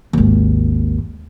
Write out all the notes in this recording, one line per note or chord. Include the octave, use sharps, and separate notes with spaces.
G#1 D#2